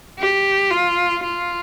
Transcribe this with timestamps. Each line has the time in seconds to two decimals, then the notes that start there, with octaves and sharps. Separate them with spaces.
0.20 G4
0.71 F4
1.23 F4